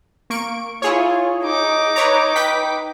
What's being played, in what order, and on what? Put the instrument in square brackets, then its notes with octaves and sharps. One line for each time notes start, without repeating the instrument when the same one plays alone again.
[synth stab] A#3 C#6 D7
[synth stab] E4 G#4 C#5 [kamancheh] F4
[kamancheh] D#4 D6
[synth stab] B4 C#5 A#5
B4 G5 B6